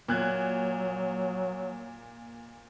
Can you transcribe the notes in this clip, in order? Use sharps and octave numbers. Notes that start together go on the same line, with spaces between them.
A#2 F#3 F#6 G#6